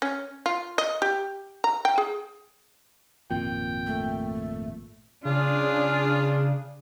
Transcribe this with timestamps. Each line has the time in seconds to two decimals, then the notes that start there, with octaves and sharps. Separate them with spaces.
0.02 C#4
0.46 F4
0.78 D#5
1.02 G4
1.64 A#5
1.85 G5
1.98 G#4
3.31 G#1 F2 A#2 G5
3.87 A3
5.25 C#3 D4 F4 G#4